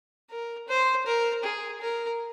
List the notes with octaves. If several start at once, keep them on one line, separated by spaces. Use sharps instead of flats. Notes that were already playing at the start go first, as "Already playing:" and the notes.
A#4
C5
A#4
G#4
A#4